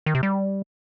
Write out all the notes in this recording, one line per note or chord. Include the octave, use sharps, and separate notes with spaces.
D#3
C3
G3